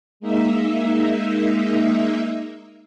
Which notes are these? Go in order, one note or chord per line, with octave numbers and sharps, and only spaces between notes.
G#3 A#3 D#4 E5